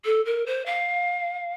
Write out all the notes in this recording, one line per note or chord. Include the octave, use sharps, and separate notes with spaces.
A4
A#4
C5
F5